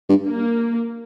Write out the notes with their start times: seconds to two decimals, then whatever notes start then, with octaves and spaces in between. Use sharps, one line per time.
0.09 G2
0.27 A#3